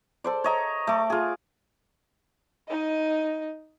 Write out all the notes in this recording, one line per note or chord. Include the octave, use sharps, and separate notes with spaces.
A4 C5 D5
C#5 D#5 A#5
A3 D6
F4 G#4
D#4 D#5